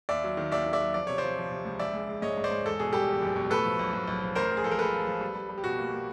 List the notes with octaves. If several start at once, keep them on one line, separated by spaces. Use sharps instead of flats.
D#2 D5 E5
F#3
D#3
D#2 D5 E5
D#3
D5 E5
F#3
F3 D5
C3 C#5
C5 D5
F3
F3
C3
C#2
A#1 D5 E5
G#3
G#3
G#2 C#5 D#5
G#2
C5 D5
G#2
E2 A4
B2 G#4
G3 G4 A4
E2
F#1
B2
A2 A4 B4
F3
B1
B1
B1
F3
A1 A#4 C5
A1
G#4
F3 A4
A#4
G#3 A4 B4
F3
F3
G3
G3
G3
G4
B2 F#4
A#3
A#3